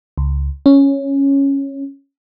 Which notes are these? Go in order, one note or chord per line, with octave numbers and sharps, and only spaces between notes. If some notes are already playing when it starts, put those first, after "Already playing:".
C#2
C#4